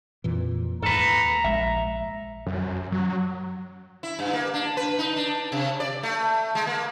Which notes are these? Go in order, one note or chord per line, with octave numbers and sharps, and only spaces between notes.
F2 A#2 E3
D#2 G#2 A4 B4 A#5
A#1 G#3 E5
F#2
F#3
E4
G2
A#3
D4
B4
D#4
D4
C3
D5
A3
G#3
A#3